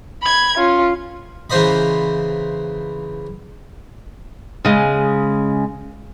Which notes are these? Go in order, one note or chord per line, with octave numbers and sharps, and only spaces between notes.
B5 G#6
C#4 F4
C#3 E3 A#3 C5 D#5 B5
C#3 G#3